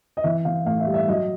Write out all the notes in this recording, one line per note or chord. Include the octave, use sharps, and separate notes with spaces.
D#5
E3 E5
E3 F5
A2 F5
E5
G3
E5
F#3 D#5